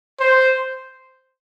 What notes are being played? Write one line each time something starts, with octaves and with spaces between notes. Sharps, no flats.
C5